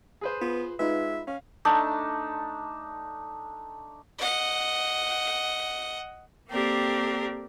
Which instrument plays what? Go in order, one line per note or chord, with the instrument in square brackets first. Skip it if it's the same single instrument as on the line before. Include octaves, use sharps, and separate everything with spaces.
[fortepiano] G#4 B4 C5
[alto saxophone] B3 [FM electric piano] F4
[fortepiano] G#3 [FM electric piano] D#4 F4 B4 [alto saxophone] E5
[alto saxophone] C#4 [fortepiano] F5
[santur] A3 D4 D#4 A5
[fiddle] D#5 F#5
[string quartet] A#3 C4 G4 A4 A#4 D5